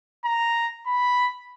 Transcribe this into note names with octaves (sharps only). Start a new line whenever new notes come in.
A#5
B5